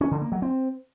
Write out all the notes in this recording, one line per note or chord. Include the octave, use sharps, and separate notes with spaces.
C#4
D3
A#3
F#3
C4